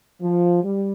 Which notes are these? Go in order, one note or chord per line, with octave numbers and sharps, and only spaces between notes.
F3
G3